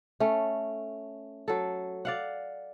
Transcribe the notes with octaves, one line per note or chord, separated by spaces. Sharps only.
A3 C#4
F#3 A4
D5 F5 F#5